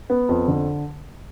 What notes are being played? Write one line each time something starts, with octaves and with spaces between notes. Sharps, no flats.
B3
F2
D3